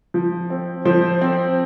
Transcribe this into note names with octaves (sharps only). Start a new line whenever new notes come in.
F3
C4
F3 C5
C4